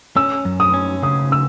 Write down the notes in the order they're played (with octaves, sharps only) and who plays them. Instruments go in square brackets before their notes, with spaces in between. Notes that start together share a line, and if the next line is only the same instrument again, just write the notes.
[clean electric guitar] C#4 [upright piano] E6
[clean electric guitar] F#2
[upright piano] D#6
[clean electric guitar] C#4
[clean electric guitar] C#3 [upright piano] D#6
[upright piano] E6